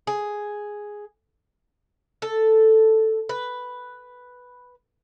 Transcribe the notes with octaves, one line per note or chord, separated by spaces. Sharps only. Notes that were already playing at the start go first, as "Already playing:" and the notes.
G#4
A4
B4